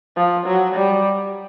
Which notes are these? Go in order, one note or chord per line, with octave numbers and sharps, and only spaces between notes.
F3
F#3
G3